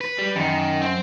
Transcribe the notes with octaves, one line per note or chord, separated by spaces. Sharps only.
B4
G3
F#2 D#3
C4